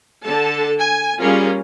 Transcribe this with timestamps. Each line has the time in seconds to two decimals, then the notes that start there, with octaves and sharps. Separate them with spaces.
0.25 D3 A4 A5
0.80 G#5
1.22 G3 A#3 C#4 F4 G#4 A#4